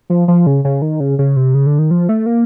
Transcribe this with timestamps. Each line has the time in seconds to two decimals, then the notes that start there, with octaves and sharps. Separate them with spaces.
0.10 F3
0.28 F3
0.47 C#3
0.65 C#3
0.82 D#3
1.00 C#3
1.19 C#3
1.36 C3
1.55 C#3
1.66 D3
1.79 D#3
1.91 F3
2.09 A3
2.26 A#3